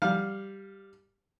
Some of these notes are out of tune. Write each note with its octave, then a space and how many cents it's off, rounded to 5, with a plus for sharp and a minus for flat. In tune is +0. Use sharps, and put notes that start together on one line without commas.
G3 +0 F5 +0